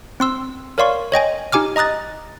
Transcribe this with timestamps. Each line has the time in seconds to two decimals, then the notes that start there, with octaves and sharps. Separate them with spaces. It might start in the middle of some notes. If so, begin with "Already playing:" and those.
0.20 C4 C6 E6
0.78 A#4 C#5 D5 F5 C6 C#6
1.12 C#5 D#5 G5 G#5
1.52 D#4 G4 G#5 D6 F6
1.76 D#5 A#5 D#6 F#6 A6